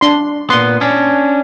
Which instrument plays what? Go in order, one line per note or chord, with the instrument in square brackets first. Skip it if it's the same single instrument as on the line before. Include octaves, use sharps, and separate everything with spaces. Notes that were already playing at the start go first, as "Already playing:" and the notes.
[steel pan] D4 C6
[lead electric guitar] A#2 B3 [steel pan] C6
[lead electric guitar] C#4 D4